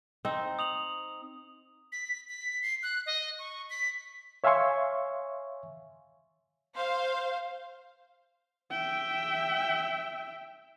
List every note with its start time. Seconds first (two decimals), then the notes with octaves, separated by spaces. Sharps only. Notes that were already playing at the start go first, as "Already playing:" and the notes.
0.25 C4 D#4
0.59 D#6 F7 F#7
1.92 B6
2.29 B6
2.62 C7
2.83 F#6
3.06 D#5
3.39 C#6
3.70 B6
4.44 C#5 E5 F5 G#5 C6 C#6
6.76 C5 F5
8.71 E5 G5